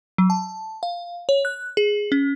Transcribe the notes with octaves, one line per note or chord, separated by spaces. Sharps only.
F#3
A5
F5
C#5
F#6
G#4
C#4